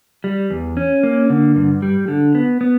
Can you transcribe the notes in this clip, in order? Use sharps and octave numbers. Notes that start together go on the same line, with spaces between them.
G3
E2
C#4
A#3
D3
G2
G3
D3
B3
B3